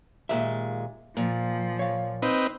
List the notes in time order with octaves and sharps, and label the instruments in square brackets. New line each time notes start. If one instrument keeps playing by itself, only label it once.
[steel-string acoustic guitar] D#2 A#2 G#3 [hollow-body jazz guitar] E5
[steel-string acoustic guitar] A#2 [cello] F3
[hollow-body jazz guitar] C#5 F5
[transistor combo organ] C4 D#4 B4